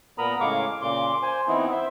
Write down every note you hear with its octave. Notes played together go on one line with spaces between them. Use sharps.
A#2 B3 A#4 A#5 B5 D#6
A2 C#3 G#3 F5 C#6 D6
A#2 C#3 C6 D6
C5 G#5
E3 B3 C4 D#4 E4
C5 E5